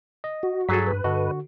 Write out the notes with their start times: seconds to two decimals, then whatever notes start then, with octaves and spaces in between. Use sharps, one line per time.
0.24 D#5
0.43 F#4
0.69 G2 F#3 G#4 A4 B6
0.87 B4
1.04 G2 D3 F#4 A4 D#5